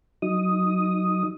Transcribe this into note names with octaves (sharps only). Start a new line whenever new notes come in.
F#3 D#4 D#6